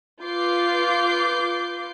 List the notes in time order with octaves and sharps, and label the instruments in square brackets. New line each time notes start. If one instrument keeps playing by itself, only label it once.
[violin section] F4 B4 D6 G6 C7